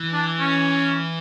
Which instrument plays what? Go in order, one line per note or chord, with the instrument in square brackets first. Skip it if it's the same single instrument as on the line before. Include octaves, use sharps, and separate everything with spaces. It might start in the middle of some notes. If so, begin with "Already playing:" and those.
Already playing: [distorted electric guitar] E3
[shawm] D4
C#4